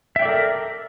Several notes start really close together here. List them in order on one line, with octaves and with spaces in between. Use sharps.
E5 G5 D5 A4 A#4